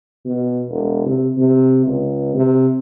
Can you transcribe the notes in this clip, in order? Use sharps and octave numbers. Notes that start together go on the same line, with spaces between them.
B2
E1
C3
C3
C#2
C3